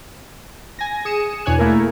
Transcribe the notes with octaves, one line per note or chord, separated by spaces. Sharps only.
G#5 A#6
G#4 D#6 C#7 E7
E2 B2 D4 C#5 G#5 F#6
A3 A#3 E4 G#4 A#4